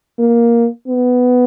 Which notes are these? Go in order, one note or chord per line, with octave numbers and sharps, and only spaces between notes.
A#3
B3